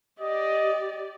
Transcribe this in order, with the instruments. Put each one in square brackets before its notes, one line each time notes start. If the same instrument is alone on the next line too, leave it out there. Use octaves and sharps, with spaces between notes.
[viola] G4 D5 [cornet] D#5